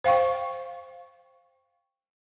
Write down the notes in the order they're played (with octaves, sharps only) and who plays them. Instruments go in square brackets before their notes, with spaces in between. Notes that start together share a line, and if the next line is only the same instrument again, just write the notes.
[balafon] C5 F5 G5 C#6